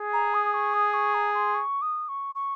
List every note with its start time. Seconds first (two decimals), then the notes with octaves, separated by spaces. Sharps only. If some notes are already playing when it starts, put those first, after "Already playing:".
Already playing: G#4
0.13 A#5
0.34 D#6
0.54 C#6
0.74 D#6
0.94 C#6
1.14 A#5
1.34 C6
1.55 C#6
1.82 D#6
2.09 C#6
2.35 C#6